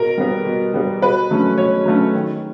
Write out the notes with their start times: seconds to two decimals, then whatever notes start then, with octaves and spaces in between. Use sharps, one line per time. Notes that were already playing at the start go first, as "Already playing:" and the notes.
Already playing: B2 A#4
0.18 G3 B3
0.45 B2
0.74 G3 B3
1.02 B2 B4
1.30 F#3 A3 C#4
1.58 B2 C#5
1.85 F#3 A3 C#4
2.14 D#3